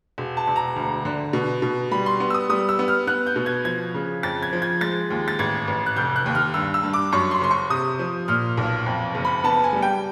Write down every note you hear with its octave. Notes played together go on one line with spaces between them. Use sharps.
E1
A5
E1
A#5
D2
D3
B2
B2
G3 B5
C6
B3
E6
D#6
G3 D#6
E6
B3
F6
B3 F#6
G6
B2
G#6
F3 G#6
C#3
F2 A6
G#6
F3
G#6
G#3 A6
D#2
A6
A1 G#6
A1
F#6
F1 G6
F#6
D#2
F6
G2 E6
E6
G2
D6
F#2 C#6
C6
F#1 C6
C#6
C3 D#6
F3
A#2 F6
B1
F2
F#1
B5
B3 A5
G#5
G3
G5